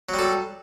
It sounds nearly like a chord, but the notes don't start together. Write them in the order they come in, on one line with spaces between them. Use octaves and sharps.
F#3 G3 A4